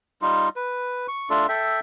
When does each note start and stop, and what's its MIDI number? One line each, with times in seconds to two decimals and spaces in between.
0.22 0.49 55
0.22 0.49 63
0.22 0.49 65
0.56 1.07 71
1.08 1.29 85
1.30 1.47 57
1.30 1.47 62
1.30 1.47 65
1.30 1.47 69
1.49 1.80 69
1.49 1.80 76
1.49 1.80 79